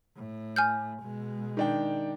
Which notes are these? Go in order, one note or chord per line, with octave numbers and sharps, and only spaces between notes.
A2
G#5 F6 G6
B2 G#3
D#3 D4 G5